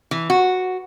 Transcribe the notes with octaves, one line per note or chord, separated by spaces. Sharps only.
E3
F#4